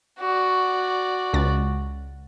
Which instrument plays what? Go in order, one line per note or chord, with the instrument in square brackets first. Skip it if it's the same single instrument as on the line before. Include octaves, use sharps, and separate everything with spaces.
[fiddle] F#4 D5
[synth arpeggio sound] C#2 A6